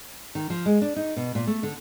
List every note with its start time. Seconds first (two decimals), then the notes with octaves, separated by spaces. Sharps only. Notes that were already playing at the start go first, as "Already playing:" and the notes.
0.35 D#3
0.50 F3
0.66 G#3
0.82 D4
0.96 D#4
1.16 B2
1.35 A#2
1.47 A3
1.63 D3